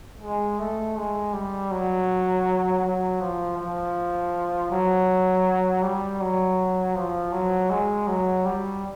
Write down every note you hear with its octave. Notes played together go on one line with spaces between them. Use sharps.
G#3
A3
G#3
G3
F#3
F#3
F3
F3
F#3
G3
F#3
F3
F#3
G#3
F#3
G3